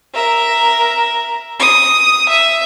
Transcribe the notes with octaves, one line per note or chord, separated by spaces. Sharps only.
A#4 E5
D#6
E5